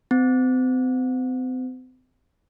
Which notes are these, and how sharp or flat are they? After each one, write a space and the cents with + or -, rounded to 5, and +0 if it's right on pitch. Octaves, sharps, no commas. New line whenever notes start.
C4 -40